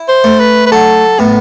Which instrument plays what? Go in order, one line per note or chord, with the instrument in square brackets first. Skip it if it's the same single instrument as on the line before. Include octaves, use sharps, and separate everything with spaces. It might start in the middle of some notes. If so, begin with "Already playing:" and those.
Already playing: [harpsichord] E4
[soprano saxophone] C5
[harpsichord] A3
[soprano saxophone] B4
B4
[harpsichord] F#3 [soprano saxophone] A4
[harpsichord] A2 [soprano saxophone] B3